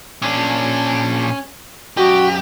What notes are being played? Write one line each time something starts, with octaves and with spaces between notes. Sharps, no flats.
A#2 C#4 D4
F#2 F#4 G4 D#5